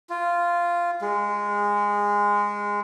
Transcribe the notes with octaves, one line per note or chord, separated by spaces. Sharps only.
F4
G#3